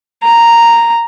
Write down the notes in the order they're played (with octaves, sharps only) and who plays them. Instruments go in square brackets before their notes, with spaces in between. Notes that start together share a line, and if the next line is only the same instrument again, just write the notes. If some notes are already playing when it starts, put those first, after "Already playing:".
[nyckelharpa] A#5